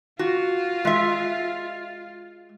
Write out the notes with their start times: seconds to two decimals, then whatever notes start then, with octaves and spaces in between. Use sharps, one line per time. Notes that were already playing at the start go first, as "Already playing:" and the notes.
0.19 F4 F#4
0.85 G#3 E5